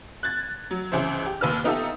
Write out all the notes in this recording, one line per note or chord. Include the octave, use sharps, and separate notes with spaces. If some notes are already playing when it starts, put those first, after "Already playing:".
F#6 G#6 A6
F#3
C#2 E3 C#4 E4 C5
G4
D#2 A#2 B4 E6 F6
B3 D#4 F4 G4 A4 E5